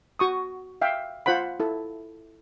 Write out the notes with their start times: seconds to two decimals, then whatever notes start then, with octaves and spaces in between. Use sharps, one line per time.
0.19 F#4 C#6 D#6
0.81 E5 F5 G5
1.26 F4 C5 F#5 B5
1.60 E4 A4